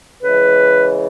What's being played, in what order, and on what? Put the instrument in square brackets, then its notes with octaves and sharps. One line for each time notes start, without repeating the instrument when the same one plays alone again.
[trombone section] C#3 E3 G#3 [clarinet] B4